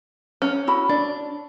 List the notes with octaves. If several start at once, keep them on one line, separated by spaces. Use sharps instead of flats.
C#4
E4 F#4 B5
D4 D5